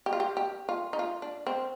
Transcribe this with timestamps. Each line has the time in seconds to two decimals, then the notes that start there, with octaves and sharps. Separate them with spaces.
0.06 G4
0.13 F4
0.20 G4
0.37 G4
0.69 F4
0.93 D#4
0.99 F4
1.22 D4
1.47 C4